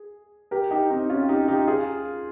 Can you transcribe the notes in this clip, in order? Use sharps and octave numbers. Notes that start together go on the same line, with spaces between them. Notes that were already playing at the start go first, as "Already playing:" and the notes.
Already playing: G#4
G4 A#4
D#4 G4
C4 D#4
C#4 F4
D#4 G4
D#4 G4
F4 G#4